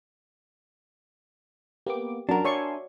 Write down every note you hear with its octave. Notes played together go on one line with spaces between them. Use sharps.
A#3 B3 G4 D6
F#2 D4 F#4 A#4
C#5 D5 E5 G#5 C6 C#6